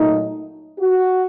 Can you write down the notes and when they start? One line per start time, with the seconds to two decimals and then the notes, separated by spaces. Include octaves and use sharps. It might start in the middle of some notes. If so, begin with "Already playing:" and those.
Already playing: A#2 F#3 A3 D#4
0.79 F#4